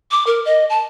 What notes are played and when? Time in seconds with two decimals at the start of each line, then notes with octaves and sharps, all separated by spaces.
0.11 D6
0.27 A#4
0.45 D#5
0.70 A5